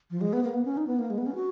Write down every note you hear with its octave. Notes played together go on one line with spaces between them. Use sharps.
F3
G#3
B3
A#3
B3
C#4
D#4
B3
A#3
G#3
B3
C#4
F#4